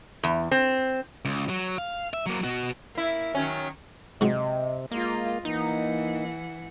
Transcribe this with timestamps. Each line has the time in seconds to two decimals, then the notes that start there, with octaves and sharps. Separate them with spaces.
0.23 E2
0.51 C4
1.25 C#2
1.49 F#3
1.78 F5
2.13 E5
2.26 F#3 A#3
2.44 B2 F#4
2.95 A#3 E4
3.34 D#3 F#3 C#4
4.21 G#2 C3 F#3 C4 D#5
4.91 G#3 A#3 F4 D#5
5.45 E3 A#3 D#4 F#5